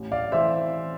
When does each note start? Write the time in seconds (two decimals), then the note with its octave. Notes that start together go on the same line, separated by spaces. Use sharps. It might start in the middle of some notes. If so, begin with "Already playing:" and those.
Already playing: A1
0.12 D5 F5
0.32 E3 A3 C5 E5